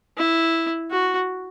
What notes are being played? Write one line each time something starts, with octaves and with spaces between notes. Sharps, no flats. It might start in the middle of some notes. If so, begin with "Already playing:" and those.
E4
F#4